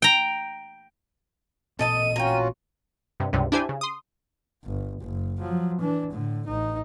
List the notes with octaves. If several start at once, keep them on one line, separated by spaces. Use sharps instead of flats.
G5 A#5
A1 A#2 C4 A4 D#5 A5 D#7
C#4 F4 F#4 A#4 G5
G2 C3
C#2 G2 C3 G3
D4 E4 G4 C5 G#5
C#3
C6 D#6
G1
F#1
F3 F#3
E3 D4
A2 D3
A1 D#4